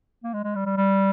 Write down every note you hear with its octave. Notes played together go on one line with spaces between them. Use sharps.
A#3
G#3
G#3
G3
G3
G3